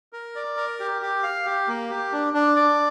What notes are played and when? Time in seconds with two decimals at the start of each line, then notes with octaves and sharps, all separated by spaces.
0.13 A#4
0.35 D5
0.57 A#4
0.80 G4
1.02 G4
1.23 F5
1.46 G4
1.68 A#3
1.90 G4
2.12 D4
2.34 D4
2.56 D5